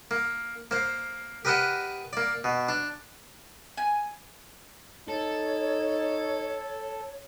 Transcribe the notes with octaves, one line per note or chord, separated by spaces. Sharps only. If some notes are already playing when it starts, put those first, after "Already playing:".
A#3
A#3 C5
G4 A#4 B4 D#5 F#5 A5
A#3 D5
B2
D4
G#5
D#4 A4 C#5